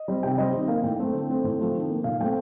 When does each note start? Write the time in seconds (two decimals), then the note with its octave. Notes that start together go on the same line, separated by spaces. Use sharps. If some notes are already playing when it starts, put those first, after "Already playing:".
Already playing: D#5
0.08 G3 C4
0.23 C3 G5
0.38 G3 C4 D#5
0.53 D#3 D#5
0.68 A#3 F5
0.83 A2 G5
0.99 A3 C4
1.14 D3
1.29 A3 C4
1.44 A2
1.59 F3 A3 C4
1.74 D#3
1.90 A#3
2.04 A#2 F5
2.21 A3 C4 G5